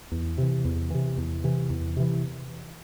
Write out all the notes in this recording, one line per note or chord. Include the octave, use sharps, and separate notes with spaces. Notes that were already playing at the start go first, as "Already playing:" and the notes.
E2
C3 E3
E2
C3 E3
E2
C3 E3
E2
C3 E3